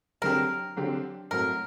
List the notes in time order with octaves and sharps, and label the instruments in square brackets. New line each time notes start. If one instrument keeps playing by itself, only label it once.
[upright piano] D3 F#3 C4 G4 [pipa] A#4
[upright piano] D3 F#3 C4 G4
[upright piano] A2 F#3 A3 C4 F#4 [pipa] A#4